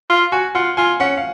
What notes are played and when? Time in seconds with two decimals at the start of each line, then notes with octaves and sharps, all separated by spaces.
0.10 F4
0.32 F#4 G#5
0.55 F4 F#5
0.77 F4 G#5
1.00 C#4 F#5
1.17 F5